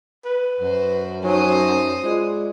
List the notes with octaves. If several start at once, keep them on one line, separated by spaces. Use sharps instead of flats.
B4
F#2 F#4 C5
F#3 D#4 C5 G#5 D#6
G#3 F4 C5 D5